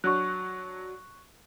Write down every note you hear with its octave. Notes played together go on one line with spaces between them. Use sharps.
F#3 D4 F#4 C#6 F#6